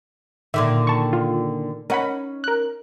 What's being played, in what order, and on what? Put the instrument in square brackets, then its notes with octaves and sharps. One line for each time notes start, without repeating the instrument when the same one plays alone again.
[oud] A#2 D3 D#3 [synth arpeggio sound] E5
[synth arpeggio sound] A5 C#6
F4
[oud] C#4 D#4 [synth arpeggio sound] A#4 F#5 B5
[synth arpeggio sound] A#4 F#6